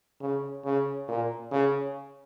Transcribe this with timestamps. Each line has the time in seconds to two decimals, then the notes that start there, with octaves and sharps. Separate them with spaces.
0.21 C#3
0.65 C#3
1.08 A#2
1.52 C#3